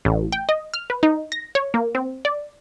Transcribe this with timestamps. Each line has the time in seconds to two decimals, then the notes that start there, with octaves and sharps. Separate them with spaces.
0.05 A1
0.32 G5
0.49 D#5
0.74 F6
0.90 B4
1.03 D#4
1.32 A#6
1.55 C#5
1.74 A#3
1.95 C4
2.25 D5